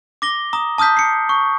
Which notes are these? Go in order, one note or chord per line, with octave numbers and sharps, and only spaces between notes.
D6 A#6 G7
A#5 D#6
A5 D#6 F6 G6 B6
C7 C#7
C#6